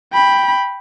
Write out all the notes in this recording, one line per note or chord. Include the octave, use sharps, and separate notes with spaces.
G5 B5